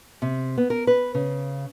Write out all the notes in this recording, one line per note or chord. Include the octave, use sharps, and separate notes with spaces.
C3
B3
A#4
B4
C#3